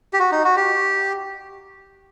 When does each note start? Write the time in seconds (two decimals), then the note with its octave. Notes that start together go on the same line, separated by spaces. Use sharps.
0.13 G4
0.19 F#4
0.32 D#4
0.44 F#4
0.56 G4